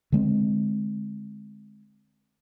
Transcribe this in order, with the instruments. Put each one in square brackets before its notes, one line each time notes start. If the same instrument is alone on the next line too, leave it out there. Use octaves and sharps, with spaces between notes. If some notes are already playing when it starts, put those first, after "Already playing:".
[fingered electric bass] D3 G#3 C4